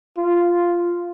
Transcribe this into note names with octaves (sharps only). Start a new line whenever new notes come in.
F4